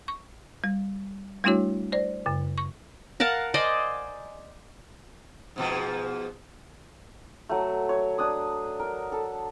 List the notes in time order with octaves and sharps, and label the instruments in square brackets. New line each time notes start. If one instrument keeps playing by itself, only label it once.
[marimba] C#6
G3
G3 A3 D4 E4 F#4 C#5
C5 D5
F#2 C#3
C#6
[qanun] A#4 F5 F#5 A5
C5 D5 D#5 G#5
[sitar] G#2 B2 F3
[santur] F#3 A3
C#5
D4 D#6
A#4
A4